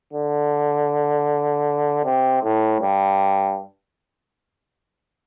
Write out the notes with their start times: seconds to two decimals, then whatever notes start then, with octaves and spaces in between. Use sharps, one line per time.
0.13 D3
2.05 C3
2.43 A2
2.81 G2